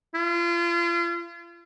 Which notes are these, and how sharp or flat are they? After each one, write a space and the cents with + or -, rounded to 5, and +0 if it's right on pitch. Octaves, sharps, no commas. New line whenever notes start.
F4 -35